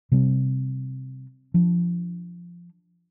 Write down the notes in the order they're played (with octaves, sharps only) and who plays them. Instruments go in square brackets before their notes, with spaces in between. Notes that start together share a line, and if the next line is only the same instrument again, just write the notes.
[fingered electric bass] C3 G3 C4
F3 D4